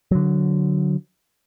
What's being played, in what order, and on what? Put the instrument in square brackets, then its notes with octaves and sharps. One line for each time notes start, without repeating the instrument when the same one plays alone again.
[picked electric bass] D3 F#3